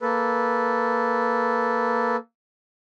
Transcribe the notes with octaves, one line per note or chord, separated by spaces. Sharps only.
A#3 A4 B4